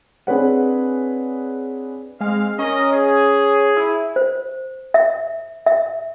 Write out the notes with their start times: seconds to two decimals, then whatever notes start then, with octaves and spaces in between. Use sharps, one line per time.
0.27 C4 D4 G#4 B4 C#5 F#5
2.20 G#3 C4 F5
2.59 C#4 A#4 D#5
2.93 G#4
3.76 E4
4.16 C5
4.94 E5
5.66 E5